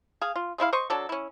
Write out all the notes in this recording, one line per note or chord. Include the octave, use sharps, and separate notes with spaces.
G#4 F5
F4
G#3 A3 E4 F5
C5 D#5 C#6
F#3 D4 A4
C#4 E4